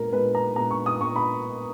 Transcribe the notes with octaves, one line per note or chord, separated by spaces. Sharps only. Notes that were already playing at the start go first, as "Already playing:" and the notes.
Already playing: A#2 G#3 B3 A#4
A#2 G#3 B3 B4
A#5
A#2 G#3 B3 A#5
C#6
D#6
A#2 G#3 B3 C#6
B5